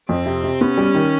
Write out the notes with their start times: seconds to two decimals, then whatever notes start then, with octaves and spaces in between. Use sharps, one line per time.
0.09 F2 C4
0.26 C3
0.44 C3
0.61 B3 C#4
0.78 G3
0.95 D#3